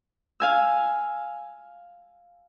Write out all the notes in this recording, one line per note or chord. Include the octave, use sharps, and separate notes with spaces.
F5 G#5 E6